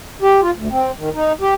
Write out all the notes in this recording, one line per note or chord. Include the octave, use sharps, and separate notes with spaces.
G4
F4
D2
C4
D#3
D#4
G4